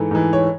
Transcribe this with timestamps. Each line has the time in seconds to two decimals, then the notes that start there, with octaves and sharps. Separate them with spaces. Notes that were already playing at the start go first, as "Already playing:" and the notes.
Already playing: G#2 E3 A4
0.11 G#2 E3
0.33 C#5